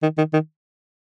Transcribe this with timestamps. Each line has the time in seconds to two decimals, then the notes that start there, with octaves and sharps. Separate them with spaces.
0.03 D#3
0.18 D#3
0.33 D#3